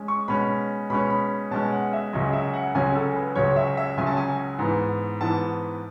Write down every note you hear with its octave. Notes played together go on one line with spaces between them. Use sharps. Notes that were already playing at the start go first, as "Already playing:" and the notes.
Already playing: G#3 C#4
C#6
B2 G#3 C#4 B5
B2 G#3 C#4 B5
B5
B2 G#3 C#4 A5
F#5
E5
C#2 C#3 F#3 C#4 D#5
E5
F#5
C#2 C#3 F#3 C#4 G#5
A4
B4
C#2 C#3 F#3 C#4 C#5
E5
E5
C#2 C#3 F#3 C#4 G#5
A5
G#5
G#2 E3 B3
G#2 E3 B3 A5